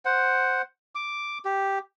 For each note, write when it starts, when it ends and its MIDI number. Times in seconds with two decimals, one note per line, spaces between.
0.05 0.62 72
0.05 0.62 78
0.95 1.38 86
1.45 1.79 67